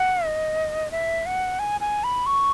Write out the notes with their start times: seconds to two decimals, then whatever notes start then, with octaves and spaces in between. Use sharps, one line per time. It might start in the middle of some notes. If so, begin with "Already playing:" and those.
Already playing: F#5
0.25 D#5
0.91 E5
1.26 F#5
1.59 G#5
1.81 G#5
2.04 B5
2.26 C#6